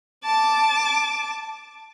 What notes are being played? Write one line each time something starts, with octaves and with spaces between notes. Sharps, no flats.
A5 D6